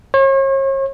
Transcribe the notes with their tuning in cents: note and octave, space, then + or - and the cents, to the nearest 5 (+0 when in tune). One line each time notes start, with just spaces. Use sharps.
C#5 -40